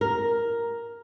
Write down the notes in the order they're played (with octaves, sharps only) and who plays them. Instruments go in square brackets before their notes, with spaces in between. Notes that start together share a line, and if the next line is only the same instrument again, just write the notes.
[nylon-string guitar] A#4